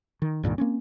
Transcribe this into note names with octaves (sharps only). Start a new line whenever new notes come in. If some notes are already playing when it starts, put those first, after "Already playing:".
D#3
C#2 G2 A#2 D#3
A#3 C4 C#4